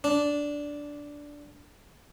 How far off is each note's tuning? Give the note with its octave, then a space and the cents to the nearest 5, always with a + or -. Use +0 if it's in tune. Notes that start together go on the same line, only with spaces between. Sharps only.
D4 -10